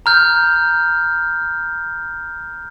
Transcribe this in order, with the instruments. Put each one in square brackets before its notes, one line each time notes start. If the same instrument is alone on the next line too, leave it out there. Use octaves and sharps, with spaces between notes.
[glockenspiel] A#5 F6 G6